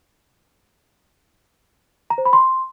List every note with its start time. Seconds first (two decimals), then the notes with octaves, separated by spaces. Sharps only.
2.10 A#5
2.18 C5
2.25 B5
2.33 C6